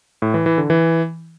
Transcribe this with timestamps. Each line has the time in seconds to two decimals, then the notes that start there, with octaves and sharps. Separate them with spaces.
0.22 A2
0.34 E3
0.46 E3
0.58 D3
0.70 E3